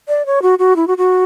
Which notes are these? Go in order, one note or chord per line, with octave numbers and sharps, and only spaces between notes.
D5
C#5
F#4
F#4
E4
F#4
F#4